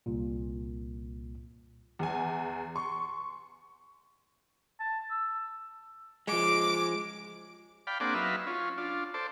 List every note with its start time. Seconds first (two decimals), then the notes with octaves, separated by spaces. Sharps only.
0.06 C2 A#2
1.99 E2 G#5
2.76 C6 C#6
4.80 A5
5.11 E6
6.27 F3 G#3 D6
7.87 D5 F5 G5 B5
8.00 A#3 C4 D4 G#4 D5 F#5
8.14 F#3 D#4 B4 E5 F5
8.47 C#4 F4
8.78 D4 F4
9.14 A4 C5 D5